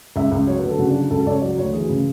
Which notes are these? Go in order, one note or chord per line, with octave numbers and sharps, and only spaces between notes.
C#2 E5
C#2
F#3 C#5
B4
D3
A4
C#3 F#4
D4
F#3
F#4
C#2 A4
A4
C#2 D5
C#5
F#3 D5
D2 C#5
E3 G#4
C#3